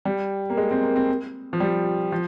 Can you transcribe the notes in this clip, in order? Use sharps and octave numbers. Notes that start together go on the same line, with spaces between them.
G3
A#3
G#3
C4
A#3
C4
F3
G3
F3